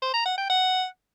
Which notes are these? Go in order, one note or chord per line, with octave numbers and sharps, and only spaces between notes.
C5
A#5
F#5
G5
F#5